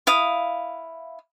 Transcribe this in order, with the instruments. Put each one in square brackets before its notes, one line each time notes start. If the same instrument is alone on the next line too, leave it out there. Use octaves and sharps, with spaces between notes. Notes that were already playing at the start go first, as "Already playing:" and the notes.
[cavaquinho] E4 F5 D#6